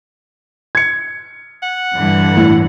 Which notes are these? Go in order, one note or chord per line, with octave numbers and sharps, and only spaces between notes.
G#6 C#7
F#5
G2 D3 E3
A2